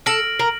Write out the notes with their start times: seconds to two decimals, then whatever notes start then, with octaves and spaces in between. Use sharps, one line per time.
0.06 A4 F6 A#6 D7 F#7
0.39 A#4